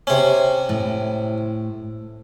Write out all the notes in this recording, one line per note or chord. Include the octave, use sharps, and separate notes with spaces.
C3 C#4
A2